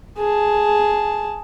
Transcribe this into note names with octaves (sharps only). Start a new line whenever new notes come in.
G#4 A5